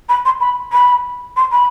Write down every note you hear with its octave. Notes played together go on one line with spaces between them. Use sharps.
B5
C6
B5
B5
C6
B5